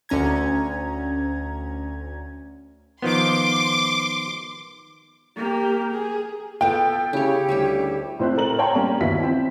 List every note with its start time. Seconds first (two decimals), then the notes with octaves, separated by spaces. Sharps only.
0.09 D2 C#4 A#5 G#6
3.02 D#3 F3 B3 C6 D6
5.36 A#3 G4
5.92 G#4
6.61 B3 F4 A4 G5
7.13 C#3 E4 G4 C#5
7.49 D2 G3 C#5 E5
8.19 A2 C4 C5 E5 F#6
8.37 A4 A#4 F#7
8.59 C#5 F5 G5 A5 A#5 C6
8.75 G3 A#3 C#4
9.00 G1 D#2 B3 E4 F#4 B6
9.23 C4